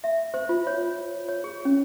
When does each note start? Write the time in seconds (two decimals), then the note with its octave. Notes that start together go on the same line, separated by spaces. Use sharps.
0.04 E5
0.34 C5
0.49 F4
0.67 C#5
1.29 C#5
1.44 G#4
1.65 C#4